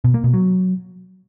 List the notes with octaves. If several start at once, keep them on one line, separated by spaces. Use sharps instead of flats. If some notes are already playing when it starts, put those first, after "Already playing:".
B2
A#3
B2
F#3